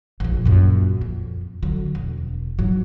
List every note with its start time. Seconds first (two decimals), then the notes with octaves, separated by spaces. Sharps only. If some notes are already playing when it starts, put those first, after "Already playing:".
0.20 F1 A#1
0.45 F#2 A#2
1.01 F2
1.63 D3 F#3
1.95 E1
2.59 G#2 F#3